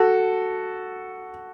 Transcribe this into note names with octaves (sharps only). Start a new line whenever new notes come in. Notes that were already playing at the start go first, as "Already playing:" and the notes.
Already playing: F#4 A4